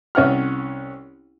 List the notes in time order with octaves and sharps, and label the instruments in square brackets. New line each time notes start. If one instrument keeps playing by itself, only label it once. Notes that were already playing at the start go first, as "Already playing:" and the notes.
[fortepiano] C2 C#4 F#5 F6